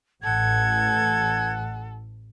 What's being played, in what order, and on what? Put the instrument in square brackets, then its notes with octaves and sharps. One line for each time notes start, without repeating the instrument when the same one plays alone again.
[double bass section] A1 [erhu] A4 [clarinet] F#5 [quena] G#6